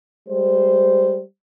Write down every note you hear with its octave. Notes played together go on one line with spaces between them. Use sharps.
G3 G#3 C5